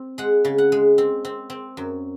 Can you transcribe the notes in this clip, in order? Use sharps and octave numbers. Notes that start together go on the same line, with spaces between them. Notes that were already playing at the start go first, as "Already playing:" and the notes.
Already playing: C4
G#3 F#5
C#3
F#5
G#3
C4
C4
C4
F#2